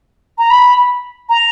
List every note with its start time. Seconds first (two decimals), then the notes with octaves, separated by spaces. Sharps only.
0.38 A#5
0.50 B5
1.29 A#5